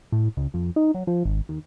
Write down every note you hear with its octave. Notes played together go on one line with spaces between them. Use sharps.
A2
C#2
F2
D#4
F#3
F3
G#1
D#2